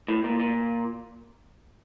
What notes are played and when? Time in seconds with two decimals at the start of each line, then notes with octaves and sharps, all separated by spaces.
0.08 A2
0.24 A#2
0.40 A#2